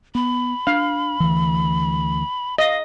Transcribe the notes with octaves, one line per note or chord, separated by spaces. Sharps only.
B3 B5
D4 F5
D2 E3
D#5 F5